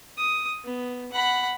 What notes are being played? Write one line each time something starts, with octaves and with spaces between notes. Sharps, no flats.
D#6
B3
F#5 B5